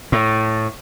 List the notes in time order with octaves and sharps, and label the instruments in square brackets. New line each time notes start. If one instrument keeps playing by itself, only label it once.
[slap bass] A2